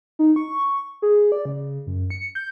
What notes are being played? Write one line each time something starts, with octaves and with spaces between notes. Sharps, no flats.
D#4
C#6
G#4
D5
C#3
F#2
C#7
G6